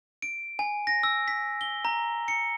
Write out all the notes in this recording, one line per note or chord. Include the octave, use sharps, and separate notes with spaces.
D7
G#5
A#6
E6
B6
G7
A#5
C#7